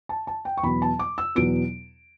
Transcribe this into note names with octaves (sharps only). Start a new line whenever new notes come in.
A5
A5
G5
C#6
E2 B2 F#3 B3 B5
A5
D6
E6
E2 B2 F#3 B3 D7